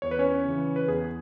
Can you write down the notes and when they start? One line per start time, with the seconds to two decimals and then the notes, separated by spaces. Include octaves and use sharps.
0.02 E2 C#5
0.11 B4
0.19 C#4 C#5
0.45 C#3 E3
0.76 B4
0.88 E2 G#4